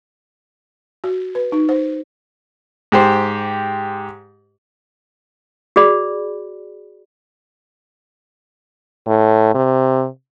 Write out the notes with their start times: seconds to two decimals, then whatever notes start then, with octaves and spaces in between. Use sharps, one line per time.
1.04 F#4
1.35 B4
1.52 D#4
1.69 C5
2.92 G#2 G4 C5
5.76 F#4 G#4 D5 B5
9.07 A2
9.54 C3